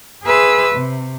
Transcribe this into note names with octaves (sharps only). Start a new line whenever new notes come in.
G#4 B4 E5 C6 E6
C3